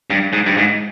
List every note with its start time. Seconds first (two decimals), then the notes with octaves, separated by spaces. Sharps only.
0.10 G2
0.33 G#2
0.46 G2
0.57 G#2